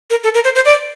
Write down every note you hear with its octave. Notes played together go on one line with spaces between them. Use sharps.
A#4
A4
A#4
C5
C5
D5